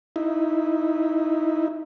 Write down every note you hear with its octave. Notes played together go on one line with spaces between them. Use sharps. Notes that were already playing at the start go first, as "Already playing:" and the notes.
D#4 E4